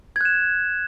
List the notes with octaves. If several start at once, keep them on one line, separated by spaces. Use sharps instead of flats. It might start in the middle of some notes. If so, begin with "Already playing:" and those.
F#6 G#6 E7